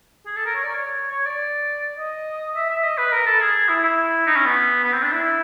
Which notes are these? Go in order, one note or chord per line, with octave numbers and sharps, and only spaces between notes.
G#4
A4
A#4
C#5
D5
C#5
C#5
D5
D#5
E5
E5
D#5
B4
A#4
A4
G#4
E4
E4
D#4
C#4
B3
B3
C4
D4
E4